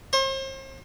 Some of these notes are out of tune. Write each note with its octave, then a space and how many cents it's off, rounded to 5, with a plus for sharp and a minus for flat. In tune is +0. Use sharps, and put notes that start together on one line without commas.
C5 +40